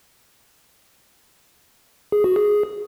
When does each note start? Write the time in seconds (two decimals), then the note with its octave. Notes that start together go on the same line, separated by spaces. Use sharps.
2.12 G#4
2.24 F#4
2.36 G#4